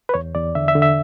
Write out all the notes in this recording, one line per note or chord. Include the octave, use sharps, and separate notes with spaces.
B4
E2 C#5
E2 D5
D3 E5
E5
D3
E5